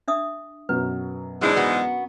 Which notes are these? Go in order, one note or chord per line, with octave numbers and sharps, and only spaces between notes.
D4 E5 D#6
F#2 B2 F#3 B4
G#2 E3 G#3 D4 E4 F#4
B3 F#4